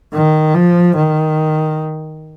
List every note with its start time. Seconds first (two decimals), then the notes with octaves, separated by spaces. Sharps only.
0.14 D#3
0.55 F3
0.96 D#3